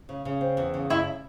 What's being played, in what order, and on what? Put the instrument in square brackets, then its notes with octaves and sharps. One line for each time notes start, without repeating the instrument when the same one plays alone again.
[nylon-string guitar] C#3
C#3
C4
E2
C#3
[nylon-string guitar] F#2 [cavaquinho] E4